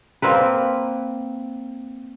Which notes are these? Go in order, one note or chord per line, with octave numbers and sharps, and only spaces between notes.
A#3 C4 A#4 B4